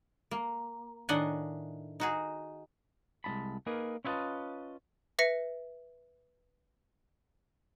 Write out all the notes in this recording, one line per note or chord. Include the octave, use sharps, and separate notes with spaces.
A#3
A2 D#3 D4 D#5 F#5 G#5
D#4 F#4 G#4
C2 G#3 D#4 A5 B5
A#3 D#4 G#4 A#4 B4
C#4 E4 F4 B4 D#5 A5
B4 E5 A#6 C#7